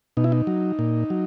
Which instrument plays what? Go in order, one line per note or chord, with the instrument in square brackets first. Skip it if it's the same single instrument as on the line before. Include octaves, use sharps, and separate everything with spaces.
[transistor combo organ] B2 D#4
E4
D#4
F#3
A#2
F#3